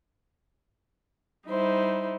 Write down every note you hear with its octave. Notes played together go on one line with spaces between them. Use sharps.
G3 D#4 E4 C5